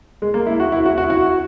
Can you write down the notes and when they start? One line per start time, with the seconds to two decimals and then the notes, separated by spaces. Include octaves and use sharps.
0.22 G#3
0.34 A#3
0.47 E4
0.60 F#4
0.72 E4
0.86 F#4
0.98 F#4
1.03 E4
1.10 F#4